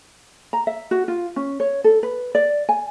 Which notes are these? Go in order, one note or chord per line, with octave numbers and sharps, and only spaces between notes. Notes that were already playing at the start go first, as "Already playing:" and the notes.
A#5
E5
F#4
F4
C#4
C#5
A4
B4
D5
G#5